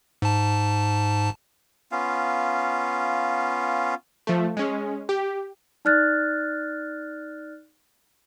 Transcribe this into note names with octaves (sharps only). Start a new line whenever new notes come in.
G#2 A5
B3 C#4 F4 F5
F3 A3
G#3 C#4
G4
D#4 D5 F6 F#6 A6